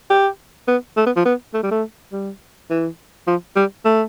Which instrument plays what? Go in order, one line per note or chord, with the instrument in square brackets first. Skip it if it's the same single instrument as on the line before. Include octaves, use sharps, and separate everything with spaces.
[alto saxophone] G4
B3
A3
B3
F3
B3
A3
G3
A3
G3
E3
F3
G3
A3